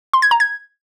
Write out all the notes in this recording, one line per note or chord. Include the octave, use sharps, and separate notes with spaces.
C6
G#6
A#5
G#6